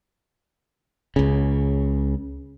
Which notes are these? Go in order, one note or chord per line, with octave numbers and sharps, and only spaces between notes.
C#2 C#3